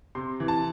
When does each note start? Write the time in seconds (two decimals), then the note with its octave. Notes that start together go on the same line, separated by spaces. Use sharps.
0.15 C3 C6
0.40 E3
0.48 A5